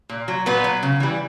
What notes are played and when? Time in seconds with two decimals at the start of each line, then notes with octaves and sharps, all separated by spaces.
0.09 A#2
0.28 F#3
0.46 A#2 B3 B4
0.64 F#3
0.83 C#3
1.00 E3 G3